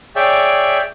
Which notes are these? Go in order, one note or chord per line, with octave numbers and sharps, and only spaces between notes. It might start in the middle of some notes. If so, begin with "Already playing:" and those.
G#4 C#5 D5 E5 G5